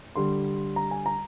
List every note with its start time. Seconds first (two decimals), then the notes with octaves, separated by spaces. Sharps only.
0.15 D3 G3 C6
0.76 A#5
0.91 G#5
1.06 A#5